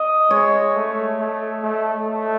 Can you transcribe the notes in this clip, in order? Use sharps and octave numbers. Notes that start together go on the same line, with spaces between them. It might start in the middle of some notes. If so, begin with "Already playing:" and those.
Already playing: D#5
G#3 C#5
A3
A3
A3
A3